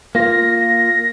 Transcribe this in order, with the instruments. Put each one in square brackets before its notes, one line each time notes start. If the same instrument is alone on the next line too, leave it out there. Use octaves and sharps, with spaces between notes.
[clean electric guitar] A#3 F4 [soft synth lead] A#6